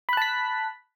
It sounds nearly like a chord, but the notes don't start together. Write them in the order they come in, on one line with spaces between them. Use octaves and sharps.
B5 F#6 A5 B6